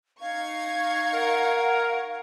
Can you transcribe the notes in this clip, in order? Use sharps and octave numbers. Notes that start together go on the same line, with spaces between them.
D#4 F5 C#6 G#6
A#4 F#5